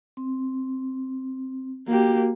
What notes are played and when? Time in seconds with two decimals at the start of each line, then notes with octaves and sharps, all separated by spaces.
0.17 C4
1.88 A#3 F#4 G4